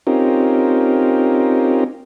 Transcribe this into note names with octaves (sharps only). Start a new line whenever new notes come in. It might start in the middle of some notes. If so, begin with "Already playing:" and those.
C4 C#4 D#4 F4 G4 A#4